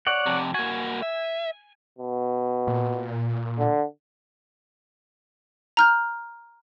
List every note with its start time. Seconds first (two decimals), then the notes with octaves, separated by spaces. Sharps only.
0.07 C#5 D5 F#5
0.26 F2 C3
0.54 A#3 F#4 G#5
1.02 E5
1.99 B2
2.67 A#2
3.59 D3
5.77 A#5 F6 G6